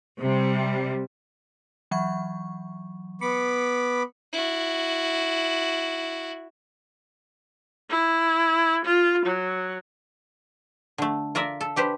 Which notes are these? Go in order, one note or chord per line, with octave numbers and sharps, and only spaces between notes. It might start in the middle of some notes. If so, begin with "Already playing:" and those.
C3 G3
E3 F#3 C#6
B3 B5 D6 C#7
E4 F#4
E4
F4
F#3
D3 A3
F4 A#4 D5 E5
A4
D4 G4 B4 C5